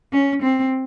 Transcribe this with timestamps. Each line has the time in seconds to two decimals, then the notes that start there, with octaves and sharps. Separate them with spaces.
0.12 C#4
0.42 C4